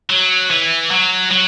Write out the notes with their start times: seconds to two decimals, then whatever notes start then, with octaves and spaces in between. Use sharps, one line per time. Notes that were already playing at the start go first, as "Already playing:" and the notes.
0.10 F#3
0.50 E3
0.91 F#3
1.31 F#3